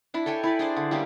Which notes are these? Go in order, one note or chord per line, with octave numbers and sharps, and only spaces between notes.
D4 E4
A4 C#5 G5 G#5
E4 B4 D5
D4 G#4 C5 D5
D3
G3 A3 A#3 C#4